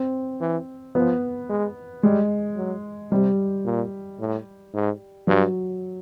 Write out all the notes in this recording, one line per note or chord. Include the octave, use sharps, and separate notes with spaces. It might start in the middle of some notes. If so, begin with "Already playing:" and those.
Already playing: C4
E3
F3 B3
G#3
G3 G#3
F#3
C3 G3
A#2
A2
G#2
G2 F#3